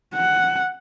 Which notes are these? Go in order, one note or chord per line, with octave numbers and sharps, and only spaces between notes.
F#5